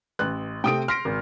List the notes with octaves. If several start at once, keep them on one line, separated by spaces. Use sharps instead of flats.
A1 F#6
C3 A3 C4 G5 D#6 D7
C6 F6 A#6 B6 D7
G#1